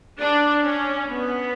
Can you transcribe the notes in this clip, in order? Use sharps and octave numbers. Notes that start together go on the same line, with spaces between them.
D4
C#4
B3